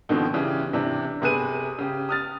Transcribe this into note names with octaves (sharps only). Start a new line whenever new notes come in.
B2 D3 D#3 F3 C4
C#3 E3 D4 G4
C3 E3 D4
G1 C3 G#4 B4 D#7
C#3 G4
D#6 F6 A6